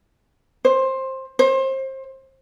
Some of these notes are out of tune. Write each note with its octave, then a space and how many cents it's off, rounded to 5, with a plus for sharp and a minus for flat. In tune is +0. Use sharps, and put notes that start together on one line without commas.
C5 +15
C5 +30